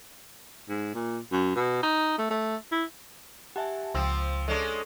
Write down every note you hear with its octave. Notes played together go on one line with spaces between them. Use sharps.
G#2
A#2
F#2
B2
D#4
A3
A3
E4
G4 E5 F#5 G#5 A5
C#2 F3 C4 C6 E6
G#3 C#4 D4 A4